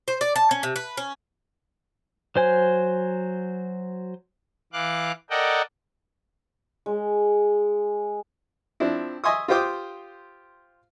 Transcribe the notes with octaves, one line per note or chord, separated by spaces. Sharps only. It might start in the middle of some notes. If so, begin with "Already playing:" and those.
C5
D5
A5
C#4
C3
B4
C#4
F#3 C5 G#5
E3 F5 D6 F#6
A4 A#4 D5 D#5 F#5 G5
G#3
F3 C4 D4 E4
D#5 E5 G#5 C6 C#6 D#6
F4 G4 C5 G5 D6 D#6